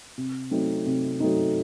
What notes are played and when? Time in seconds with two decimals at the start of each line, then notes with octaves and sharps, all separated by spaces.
0.18 C3
0.51 F#3 A3 C4 D#4
0.86 C3
1.20 F#3 A3 C4 D#4